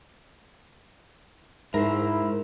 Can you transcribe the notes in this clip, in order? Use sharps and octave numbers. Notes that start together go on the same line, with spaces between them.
G#2 E4 A#4 C5